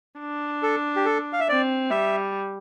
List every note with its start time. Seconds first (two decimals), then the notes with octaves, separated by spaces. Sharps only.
0.20 D4
0.63 A4
0.96 G4
1.05 A4
1.33 F5
1.40 E5
1.49 C4 D5
1.90 G3 E5